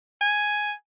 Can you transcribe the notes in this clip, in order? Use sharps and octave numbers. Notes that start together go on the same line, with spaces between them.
G#5